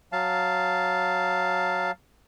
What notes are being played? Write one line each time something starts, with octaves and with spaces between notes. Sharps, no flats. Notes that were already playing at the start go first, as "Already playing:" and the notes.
F#3 F5 A5